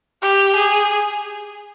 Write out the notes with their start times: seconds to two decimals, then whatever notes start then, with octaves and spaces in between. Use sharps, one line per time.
0.22 G4
0.56 G#4